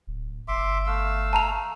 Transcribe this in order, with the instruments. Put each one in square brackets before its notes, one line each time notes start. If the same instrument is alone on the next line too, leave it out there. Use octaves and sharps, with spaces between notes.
[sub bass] D1
[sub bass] G1 [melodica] E5 C6 D6
[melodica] A3 F5 E6
[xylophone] A5 A#5 F7